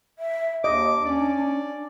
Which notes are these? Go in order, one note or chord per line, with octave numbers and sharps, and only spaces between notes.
E5
D#2 D4 D#5 D6
C#4 D5